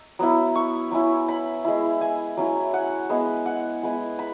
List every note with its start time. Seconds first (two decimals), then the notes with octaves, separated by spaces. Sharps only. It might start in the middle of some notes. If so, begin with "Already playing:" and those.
Already playing: E6
0.19 F#3 B3 E4
0.55 C#6
0.91 F#3 C#4 E4
1.28 B5
1.65 G#3 E4
2.01 G#5
2.37 F#3 C#4 E4
2.74 F#5
3.09 G#3 B3 E4
3.46 F#5
3.83 G#3 B3 E4
4.19 B5